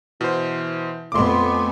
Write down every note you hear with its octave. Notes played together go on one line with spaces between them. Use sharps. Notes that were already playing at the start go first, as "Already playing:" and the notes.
B2 E3 C5
F2 A3 B3 G#5 C6 D6